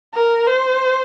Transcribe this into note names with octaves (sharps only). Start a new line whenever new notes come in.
A#4
C5